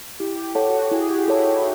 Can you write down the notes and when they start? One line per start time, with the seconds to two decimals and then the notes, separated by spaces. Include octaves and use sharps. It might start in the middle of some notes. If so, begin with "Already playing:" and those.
0.20 E4 G4
0.44 G4
0.55 A4 C#5 F#5 A5
0.68 F#4
0.91 E4 G#4
1.10 G4
1.28 E4 A4 C#5 F#5 A5
1.46 D#4